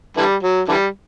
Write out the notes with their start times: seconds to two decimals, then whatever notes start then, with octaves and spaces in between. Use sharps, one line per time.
0.17 D3 E3 G3
0.43 F#3
0.68 D3 E3 G3